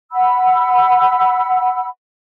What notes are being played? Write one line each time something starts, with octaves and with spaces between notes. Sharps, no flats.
F#5 B5 E6